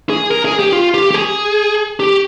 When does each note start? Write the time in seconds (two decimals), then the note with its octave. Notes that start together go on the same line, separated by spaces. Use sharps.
0.10 G#4
0.31 A#4
0.45 G#4
0.59 G4
0.72 F4
0.94 G4
1.11 G4
1.14 G#4
2.00 G4